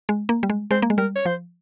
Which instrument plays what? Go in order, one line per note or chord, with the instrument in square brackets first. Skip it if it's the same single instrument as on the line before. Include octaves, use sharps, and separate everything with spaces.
[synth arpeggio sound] G#3
A#3
G3
G#3
[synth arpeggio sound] G#3 [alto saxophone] C5
[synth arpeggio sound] A#3
G#3
[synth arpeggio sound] G3 [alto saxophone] A#4
[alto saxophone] C#5
[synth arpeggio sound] F3 [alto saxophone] C5